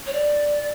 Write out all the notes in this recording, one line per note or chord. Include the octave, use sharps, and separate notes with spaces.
C#5
D5